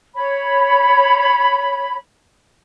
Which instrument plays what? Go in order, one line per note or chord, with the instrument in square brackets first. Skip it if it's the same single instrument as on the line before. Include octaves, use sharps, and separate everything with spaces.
[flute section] C#5 B5